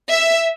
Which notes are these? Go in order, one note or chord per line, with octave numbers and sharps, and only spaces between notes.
E5